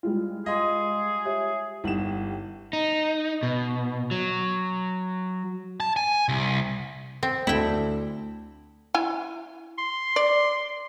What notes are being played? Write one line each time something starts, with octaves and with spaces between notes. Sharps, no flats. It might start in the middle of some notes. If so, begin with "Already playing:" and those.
G3 G#3 F4
G#4 D#5 F5 C6
G4 C#5 E5
G1 G3 D#4 E4 G4 F#5 E7 F#7
D#4
B2
F#3
A5
G#5
C2
C4
D2 D4 E4 A4 G5
E4 G#5
C6
D5